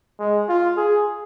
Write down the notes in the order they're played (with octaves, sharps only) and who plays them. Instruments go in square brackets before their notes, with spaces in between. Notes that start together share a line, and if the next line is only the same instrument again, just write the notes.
[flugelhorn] G#3
F4
G#4